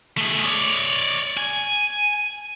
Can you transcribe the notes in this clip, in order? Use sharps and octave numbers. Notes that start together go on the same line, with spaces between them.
A3 G#4
C#5 D5
G#5